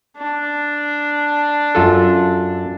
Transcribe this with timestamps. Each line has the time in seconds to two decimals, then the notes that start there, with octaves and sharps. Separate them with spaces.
0.17 D4
1.75 F#2 F4 A4